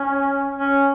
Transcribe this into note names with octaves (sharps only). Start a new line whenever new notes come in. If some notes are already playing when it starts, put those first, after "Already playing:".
Already playing: C#4
C#4